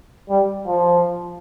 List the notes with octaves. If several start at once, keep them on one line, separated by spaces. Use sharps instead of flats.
G3
F3